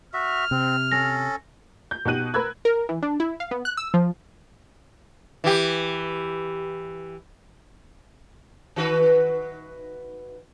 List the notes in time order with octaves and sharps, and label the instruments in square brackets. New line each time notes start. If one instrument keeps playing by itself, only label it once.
[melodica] F#4 E5 [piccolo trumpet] F6
[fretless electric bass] C3 [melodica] C4
[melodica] C#4 A4 [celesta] A#6
[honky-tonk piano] G6
B2 D#4 G4 F#6 D#7 F#7
A#4 B4 B5 E6 F#6 G#6
[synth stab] A#4
E3
D4
E4
F5
B3
F#6
E6
F3
[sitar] E3 G4
D#3 F#4 B4